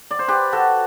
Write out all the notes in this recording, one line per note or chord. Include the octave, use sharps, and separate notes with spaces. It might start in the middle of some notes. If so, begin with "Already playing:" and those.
D5
C5
G4 B4
F#4 A4